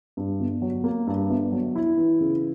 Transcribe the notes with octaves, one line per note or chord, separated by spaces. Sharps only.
G2
G1
F#3
A#3
G2
G1
F#3
E4
E3
C#3